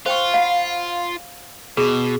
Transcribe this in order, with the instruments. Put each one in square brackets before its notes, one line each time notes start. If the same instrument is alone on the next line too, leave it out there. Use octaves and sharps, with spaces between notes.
[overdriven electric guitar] F4 [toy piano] C5 G5 C#6
[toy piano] F5 F#5 B5
[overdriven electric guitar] B2 [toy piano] G#4